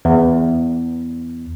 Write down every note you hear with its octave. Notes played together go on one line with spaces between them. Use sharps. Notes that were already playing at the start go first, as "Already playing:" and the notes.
E2